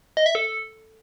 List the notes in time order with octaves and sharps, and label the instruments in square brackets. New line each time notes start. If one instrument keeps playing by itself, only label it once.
[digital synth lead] D#5
E5
A4